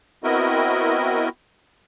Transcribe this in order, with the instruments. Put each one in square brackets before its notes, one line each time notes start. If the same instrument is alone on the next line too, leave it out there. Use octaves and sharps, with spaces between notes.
[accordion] B3 C4 E4 F#4 A#4 D#5